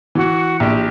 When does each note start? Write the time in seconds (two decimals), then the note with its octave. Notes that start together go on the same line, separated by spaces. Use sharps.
0.15 E3 F#4
0.60 A#1 G4